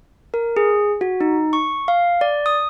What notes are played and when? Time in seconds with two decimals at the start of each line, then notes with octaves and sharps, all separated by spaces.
0.34 A#4
0.56 G#4
1.01 F#4
1.21 D#4
1.53 C#6
1.88 F5
2.21 D5
2.46 D#6